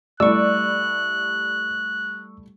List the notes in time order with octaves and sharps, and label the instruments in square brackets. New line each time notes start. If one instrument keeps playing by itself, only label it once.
[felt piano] G3 A3 E4 [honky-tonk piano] D5 [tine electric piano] C#6 E6 [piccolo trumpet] F#6